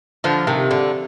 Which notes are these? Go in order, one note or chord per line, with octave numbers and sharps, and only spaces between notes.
D3 F3
C3 D#3
D3